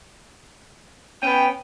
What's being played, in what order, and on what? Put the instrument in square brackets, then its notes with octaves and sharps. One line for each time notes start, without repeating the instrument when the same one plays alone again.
[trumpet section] B3 G5 [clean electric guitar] C#4